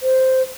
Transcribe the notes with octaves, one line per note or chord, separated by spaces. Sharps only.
C5